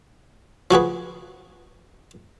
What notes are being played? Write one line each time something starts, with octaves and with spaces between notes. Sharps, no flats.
F3 F#4 G#4 B4